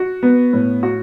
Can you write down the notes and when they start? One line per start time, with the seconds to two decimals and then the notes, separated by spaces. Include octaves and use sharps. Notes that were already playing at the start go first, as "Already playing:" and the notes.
Already playing: F#4
0.23 B3
0.53 A2
0.83 F#4